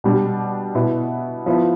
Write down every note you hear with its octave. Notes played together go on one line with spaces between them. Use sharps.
B2 G3 D4
B2 B3 E4
F3 B3 E4